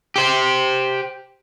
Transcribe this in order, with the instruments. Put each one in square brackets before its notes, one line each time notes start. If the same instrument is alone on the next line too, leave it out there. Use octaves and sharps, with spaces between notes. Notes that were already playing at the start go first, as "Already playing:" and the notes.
[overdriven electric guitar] G4 C5